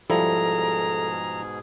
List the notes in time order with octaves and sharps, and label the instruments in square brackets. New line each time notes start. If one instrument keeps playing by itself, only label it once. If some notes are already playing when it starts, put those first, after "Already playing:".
[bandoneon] G#2 B2 G#4 [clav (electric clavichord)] F3 G3 E4 [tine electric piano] A4 [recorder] A#5